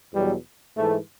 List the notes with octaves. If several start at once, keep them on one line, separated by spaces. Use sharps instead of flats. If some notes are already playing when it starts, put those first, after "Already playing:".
E2 B2 F#3 G3
G#2 E3 A3